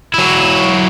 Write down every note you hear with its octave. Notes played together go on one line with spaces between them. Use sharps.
F#3 E4